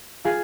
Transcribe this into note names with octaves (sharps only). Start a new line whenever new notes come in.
F4 G#4